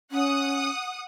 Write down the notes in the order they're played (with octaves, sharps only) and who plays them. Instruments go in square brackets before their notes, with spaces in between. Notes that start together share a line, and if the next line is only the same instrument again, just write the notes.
[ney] C#4 [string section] F#5 D#6